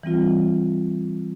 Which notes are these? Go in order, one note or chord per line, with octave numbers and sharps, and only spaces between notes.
E3 G3 C4 F4